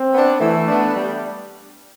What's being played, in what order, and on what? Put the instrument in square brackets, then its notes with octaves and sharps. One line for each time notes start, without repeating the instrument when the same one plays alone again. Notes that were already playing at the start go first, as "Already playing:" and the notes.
Already playing: [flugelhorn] C4
[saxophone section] B3 D4
[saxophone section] E3 [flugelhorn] A3
[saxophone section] B3 D4
G3